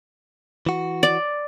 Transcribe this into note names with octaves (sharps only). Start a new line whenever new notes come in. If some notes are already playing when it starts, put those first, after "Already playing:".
E3 F#4
D5